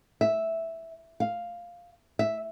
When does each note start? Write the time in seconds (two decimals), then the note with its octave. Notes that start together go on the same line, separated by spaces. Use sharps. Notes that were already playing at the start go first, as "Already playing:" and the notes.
0.21 E5
1.20 F5
2.19 E5